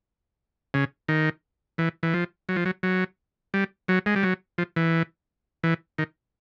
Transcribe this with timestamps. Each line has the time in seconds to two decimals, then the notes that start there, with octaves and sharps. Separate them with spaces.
0.74 C#3
1.08 D#3
1.78 E3
2.03 E3
2.14 F3
2.49 F#3
2.56 F3
2.65 F#3
2.83 F#3
3.54 G3
3.88 F#3
4.06 G#3
4.16 G3
4.23 F#3
4.58 F3
4.76 E3
5.64 E3
5.98 D#3